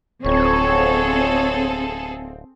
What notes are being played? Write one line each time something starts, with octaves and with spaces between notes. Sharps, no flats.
D1 F2 C4 G#4 A4 C#5